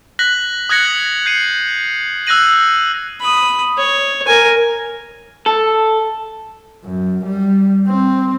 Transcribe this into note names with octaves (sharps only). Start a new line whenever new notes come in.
F#6 A#6 B6 F#7
D#6 F#6 G#6 A#6 C#7 F#7
G6 C7 C#7 D#7
E6 F#6 G6 A#6 D#7 F#7
B5 D#6
C#5
A#4 G#5
A4
F#2
G3
C4